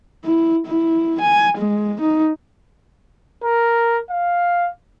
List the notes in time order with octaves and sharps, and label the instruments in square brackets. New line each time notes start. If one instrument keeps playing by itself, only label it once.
[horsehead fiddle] E4
E4
G#5
G#3
D#4
[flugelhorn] A#4
F5